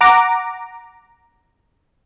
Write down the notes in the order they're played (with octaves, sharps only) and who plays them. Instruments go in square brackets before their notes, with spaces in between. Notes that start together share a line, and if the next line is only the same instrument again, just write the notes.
[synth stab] F#5 A#5 D6